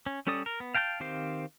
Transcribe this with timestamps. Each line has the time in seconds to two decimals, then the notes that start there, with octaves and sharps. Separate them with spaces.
0.06 C#4
0.27 G3 C#4 A4 D5 D#6
0.46 A#4
0.60 B3
0.75 F5 G5 A5 A#5 G6
1.00 D#3 C4 G4 C5 F5